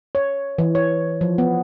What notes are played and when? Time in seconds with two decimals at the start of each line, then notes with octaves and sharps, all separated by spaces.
0.15 C#5
0.58 E3
0.75 C#5
1.21 F3
1.38 B3